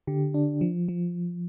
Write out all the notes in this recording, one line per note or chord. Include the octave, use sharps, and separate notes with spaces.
D3 G4
D4
F3
F3